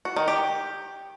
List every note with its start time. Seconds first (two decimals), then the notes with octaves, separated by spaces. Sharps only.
0.05 F#4
0.16 D#3
0.28 G4